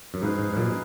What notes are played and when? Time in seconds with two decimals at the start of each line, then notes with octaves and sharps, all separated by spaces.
0.14 F#2
0.22 G#2 D#4 G#4 B4 F5
0.39 G#2
0.53 G#2
0.57 F#2 A#2